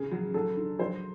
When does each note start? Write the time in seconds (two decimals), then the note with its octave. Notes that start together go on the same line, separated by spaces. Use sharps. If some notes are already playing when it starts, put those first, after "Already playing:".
Already playing: C#3 G#4
0.11 F#3
0.34 F#3 A4
0.57 D3
0.79 F#3 C5